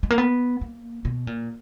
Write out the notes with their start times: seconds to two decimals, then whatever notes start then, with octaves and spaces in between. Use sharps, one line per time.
0.03 G#3
0.10 A#3
0.18 B3
0.61 A#3
1.05 B2
1.27 A#2